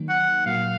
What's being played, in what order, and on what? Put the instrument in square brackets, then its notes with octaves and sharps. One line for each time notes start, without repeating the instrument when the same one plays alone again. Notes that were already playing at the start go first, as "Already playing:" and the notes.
Already playing: [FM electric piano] D#3 F#3 A#3 D#4
[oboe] F#5
[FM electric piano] A#2 F#3 A#3 [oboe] F5